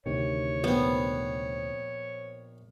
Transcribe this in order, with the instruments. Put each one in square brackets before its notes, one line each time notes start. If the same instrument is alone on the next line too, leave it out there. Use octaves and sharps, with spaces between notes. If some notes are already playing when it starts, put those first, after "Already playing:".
[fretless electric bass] D2 C3 D#3 [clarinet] C#5
[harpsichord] A#1 C4 [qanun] B3